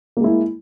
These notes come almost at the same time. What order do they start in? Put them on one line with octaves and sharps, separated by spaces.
A#3 G#3 E4